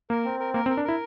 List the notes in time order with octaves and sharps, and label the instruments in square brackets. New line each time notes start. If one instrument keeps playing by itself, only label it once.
[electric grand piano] A#3 [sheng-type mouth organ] A#4
[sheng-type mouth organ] C4
A#4
[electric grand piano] A#3 [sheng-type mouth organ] A#4
[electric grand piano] C4
[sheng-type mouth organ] A#4
[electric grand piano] D4
[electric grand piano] E4 [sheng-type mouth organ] A#4